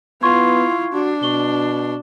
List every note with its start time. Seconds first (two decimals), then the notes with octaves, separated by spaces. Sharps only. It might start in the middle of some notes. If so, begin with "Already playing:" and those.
0.23 B3 E4 F4 C6 C#6 G#6
0.93 D4 F#4
1.23 B2 C#6 G7